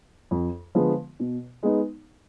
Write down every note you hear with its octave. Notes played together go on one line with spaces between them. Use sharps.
F2
D3 F3 G#3 B3
B2
G#3 B3 D#4